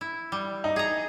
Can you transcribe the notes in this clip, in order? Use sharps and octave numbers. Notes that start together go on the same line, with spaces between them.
E4
G3
D#4
G#4 A#5